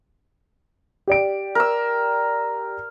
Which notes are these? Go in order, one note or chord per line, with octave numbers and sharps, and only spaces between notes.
G4 D5 D7
A#4 E6